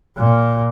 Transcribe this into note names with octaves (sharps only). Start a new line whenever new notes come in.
A#2